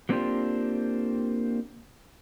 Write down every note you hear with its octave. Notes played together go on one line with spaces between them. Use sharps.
F#3 A#3 C4 D4 F4 G4